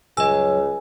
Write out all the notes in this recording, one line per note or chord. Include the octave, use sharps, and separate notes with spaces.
C#2 F#2 C#3 F#3 D#5 G#5 E6